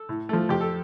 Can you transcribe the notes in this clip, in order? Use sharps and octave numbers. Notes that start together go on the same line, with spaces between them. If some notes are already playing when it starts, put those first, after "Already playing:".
Already playing: A4
A2
F3 A3
F2 G4
A4